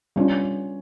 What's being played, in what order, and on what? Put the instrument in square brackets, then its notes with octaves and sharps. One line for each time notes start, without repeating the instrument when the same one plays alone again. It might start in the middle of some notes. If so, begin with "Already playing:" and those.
[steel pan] G3 B3 D4 F4 [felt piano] C#4